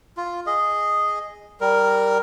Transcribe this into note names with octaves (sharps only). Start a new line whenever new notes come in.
F4
G#4 D#5
G3 A#4